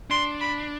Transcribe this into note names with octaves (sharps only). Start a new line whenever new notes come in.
D4 C6
B5